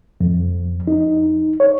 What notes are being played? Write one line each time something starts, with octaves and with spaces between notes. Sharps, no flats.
F2
D#4
C#5